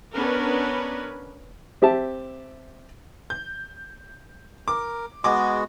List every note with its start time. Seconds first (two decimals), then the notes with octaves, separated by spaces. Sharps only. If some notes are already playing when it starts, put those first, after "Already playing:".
0.14 B3 C#4 D4 A#4 B4
1.82 C4 G4 E5 A5
3.30 G6
4.68 A#4 D6
5.24 G#3 B3 F#4 G#4 D#5 D6